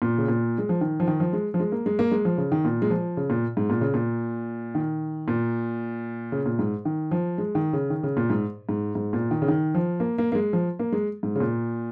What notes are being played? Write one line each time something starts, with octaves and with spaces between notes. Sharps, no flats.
A#2
C#3
A#2
G#3
F3
D#3
F3
D#3
F3
G#3
F3
G#3
A#3
G#3
A#3
G#3
F3
C#3
D#3
A#2
G#3
F3
C#3
A#2
G#2
A#2
C#3
A#2
D#3
A#2
C#3
A#2
G#2
D#3
F3
G#3
D#3
C#3
D#3
C#3
A#2
G#2
G#2
G#2
A#2
D#3
C#3
D#3
F3
A#3
A#3
A#3
G#3
F3
A#3
G#3
G#2
C#3
A#2